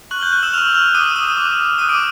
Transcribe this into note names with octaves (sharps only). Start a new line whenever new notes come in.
C#6 F6 F#6 F#7
G6 G7
F#6 F#7
E6 E7
C#6 F6 F7
F6 F7
D6 D#6 F#6 D#7
D#6 D#7
D6 F#6
D#6 F#6 D#7
D6 D7